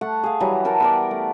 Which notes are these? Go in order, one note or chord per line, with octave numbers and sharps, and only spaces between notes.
A3 F#5
G#4 F5
E3 F#3 G3 A#5
A#4 F#5 G5 A5
B3 A#4 D5
A3